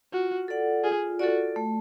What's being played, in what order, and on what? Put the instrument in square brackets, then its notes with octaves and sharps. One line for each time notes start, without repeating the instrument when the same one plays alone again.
[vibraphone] F4 [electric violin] F#4
[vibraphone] A4 D5 F#5
[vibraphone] F4 [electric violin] G#4
[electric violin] F#4 [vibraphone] A4 D5
[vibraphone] A3